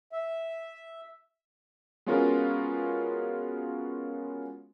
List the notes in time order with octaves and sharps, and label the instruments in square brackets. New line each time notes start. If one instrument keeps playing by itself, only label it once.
[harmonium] E5
[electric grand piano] G#3 B3 C#4 F4 F#4 A#4